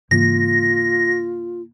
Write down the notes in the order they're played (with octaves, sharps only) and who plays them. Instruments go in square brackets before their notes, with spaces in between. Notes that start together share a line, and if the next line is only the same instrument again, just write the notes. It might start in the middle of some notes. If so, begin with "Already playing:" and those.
[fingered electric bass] G#2 C#3 E3 [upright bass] A#3 [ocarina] F4 [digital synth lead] A#6